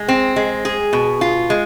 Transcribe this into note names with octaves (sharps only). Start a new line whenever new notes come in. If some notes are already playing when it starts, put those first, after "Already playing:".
Already playing: G#3
C4
G#3
G#4
B2
F4
G#3